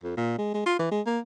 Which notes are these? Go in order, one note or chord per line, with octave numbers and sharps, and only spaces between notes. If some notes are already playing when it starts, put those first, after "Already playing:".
F2
A#2
G#3
G#3
F4
E3
G#3
A#3